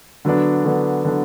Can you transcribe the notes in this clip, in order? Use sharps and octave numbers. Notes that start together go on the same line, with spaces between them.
D3 F#3 B3 D4
D3 F#3 B3 D4
D3 F#3 B3 D4